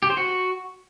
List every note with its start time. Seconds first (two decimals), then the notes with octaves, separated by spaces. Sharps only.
0.03 G4
0.10 C5
0.17 F#4